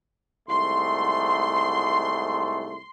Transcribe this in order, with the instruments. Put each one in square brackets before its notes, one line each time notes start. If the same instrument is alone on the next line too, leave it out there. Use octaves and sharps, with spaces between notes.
[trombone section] C2 G#2 A3 [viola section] C6